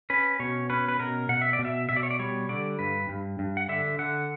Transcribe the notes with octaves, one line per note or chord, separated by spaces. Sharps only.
C#4 B4
B2 C#5
C#4 B4
B4
B2 A#4
B2 F#5
E5
D5
B2
E5
B2 E5
D5
C#5
D5
G3 C#5
D3 D5
G2 B4
G2
G2
F#5
D3 E5
D3 F#5